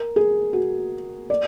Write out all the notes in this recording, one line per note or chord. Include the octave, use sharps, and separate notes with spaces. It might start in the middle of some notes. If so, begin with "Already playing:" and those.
Already playing: A#4
G#4
F#4
D5